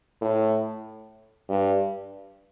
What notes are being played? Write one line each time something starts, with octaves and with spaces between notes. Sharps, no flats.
A2
G2